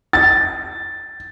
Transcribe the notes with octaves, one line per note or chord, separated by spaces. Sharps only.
A6